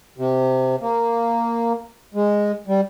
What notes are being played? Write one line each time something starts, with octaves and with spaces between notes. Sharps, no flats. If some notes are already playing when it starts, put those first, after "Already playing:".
C3
A#3
G#3
G3